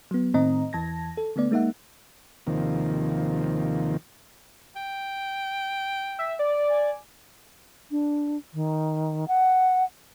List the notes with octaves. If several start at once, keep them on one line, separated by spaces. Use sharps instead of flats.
F#3 B3
A2 D#3 C4 D#5 A#5
E2 E3 A5 G#6 A#6
A4
D3 A3 B3 D5
G#3 A#3 D#4 E5 F#5
D#2 C3 D#3 F3 A#3
G5
E5
D5
G#5
D4
D#3
F#5